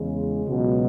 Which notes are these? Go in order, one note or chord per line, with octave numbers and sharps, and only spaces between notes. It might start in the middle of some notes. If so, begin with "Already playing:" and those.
Already playing: E2 C#3 G#3
C#2 B2 F#3